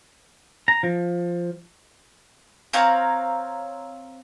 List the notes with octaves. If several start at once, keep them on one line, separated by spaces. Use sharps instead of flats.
A#5
F3
C4 C#5 F5 A#5